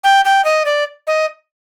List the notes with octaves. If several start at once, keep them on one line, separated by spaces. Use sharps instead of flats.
G5
G5
D#5
D5
D#5